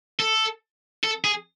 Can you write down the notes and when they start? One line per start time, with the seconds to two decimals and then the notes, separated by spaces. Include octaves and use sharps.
0.20 A4
1.04 A4
1.24 G#4